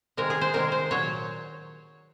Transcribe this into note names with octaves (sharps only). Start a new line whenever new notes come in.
C3 D#3 G#3 A#4
G#4
C5
C3 D#3 G#3 A#4
C5
A#2 F#3 C#5